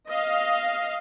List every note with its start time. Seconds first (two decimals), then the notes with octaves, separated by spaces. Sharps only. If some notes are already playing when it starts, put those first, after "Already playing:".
0.10 D#5 F5